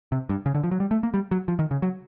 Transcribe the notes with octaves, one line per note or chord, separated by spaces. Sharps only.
C3
G2
C#3
D3
F3
F#3
G3
A3
A#3
G3
F#3
F3
D#3
C#3
F#3